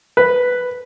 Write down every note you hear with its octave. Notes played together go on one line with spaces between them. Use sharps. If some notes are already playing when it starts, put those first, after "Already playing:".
B4